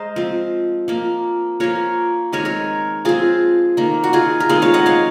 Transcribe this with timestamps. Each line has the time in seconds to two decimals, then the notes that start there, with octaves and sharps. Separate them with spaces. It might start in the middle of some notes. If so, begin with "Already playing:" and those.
Already playing: G#3 C5 D#5 F5 A#5
0.16 F3 C4
0.88 F3 A#3
1.60 F3 A#3 A#4 C#5
2.32 D#3 G#3 C4 A#4 C#5
2.45 A#4 C#5
3.05 F3 C4 F4 G#4
3.77 D#3 A#3
4.04 F#4
4.13 F4 G#4
4.40 A#4
4.49 D#3 G#3 C4 F4 G#4
4.62 C#5 F5
4.74 D#5 F#5
4.86 C#5 F5